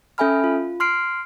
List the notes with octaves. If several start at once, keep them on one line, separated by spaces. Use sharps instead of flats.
C#4 A4 E5 G#5 B5 F6
F4
C6 F6 C7 D7